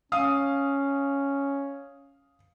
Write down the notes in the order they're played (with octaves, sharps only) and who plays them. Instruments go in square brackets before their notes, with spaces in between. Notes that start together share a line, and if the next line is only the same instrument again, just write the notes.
[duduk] C#4 [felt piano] F5 D#6